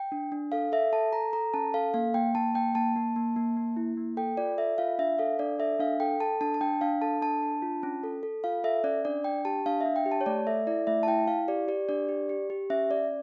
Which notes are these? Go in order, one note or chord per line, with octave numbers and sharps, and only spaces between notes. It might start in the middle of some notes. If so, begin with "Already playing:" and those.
Already playing: G5
D4
D4
A4 F5
A4 E5
A4 A5
A4 A#5
A4 A#5
C#4 A5
A4 F5
A#3 F5
A#3 G5
A#3 A5
A#3 G5
A#3 A5
A#3
A#3
A#3
A#3
E4
A#3
A4 G5
F4 D5
A4 E5
F4 F5
D4 E5
A4 F5
D4 D5
A4 E5
D4 F5
A4 G5
A4 A5
D4 A5
A5
D4 G5
D4 F5
A4 A5
D4 A5
D4
F4
C#4
A4
A4
F4 F5
A4 E5
C#4 D5
D4 D5
D4 G5
G4 A5
D4 F5
E5
D4
G5
G4
A5
C#5
A3 D5
A4 E5
E4 D5
A3 E5
A5
E4 G5
E4 F5
G4 D5
G4 D5
D4 D5
G4
G4
G4
C#4 E5
C#4 D5